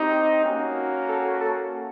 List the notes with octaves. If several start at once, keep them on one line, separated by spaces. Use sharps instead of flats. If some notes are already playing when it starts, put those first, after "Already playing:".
Already playing: C4 D#4 G4
A#3 C#4 F#4
A4
A4